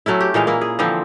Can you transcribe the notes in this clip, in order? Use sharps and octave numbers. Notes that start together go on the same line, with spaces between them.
F#3 A3 C#4 E4
G4
A#2 E3 G#3 F5
A#3 E4
G#4
D3 E3 F3 C4